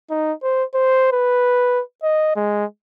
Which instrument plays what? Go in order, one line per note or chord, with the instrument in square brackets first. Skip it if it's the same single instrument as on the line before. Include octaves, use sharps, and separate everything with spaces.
[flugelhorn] D#4
C5
C5
B4
D#5
G#3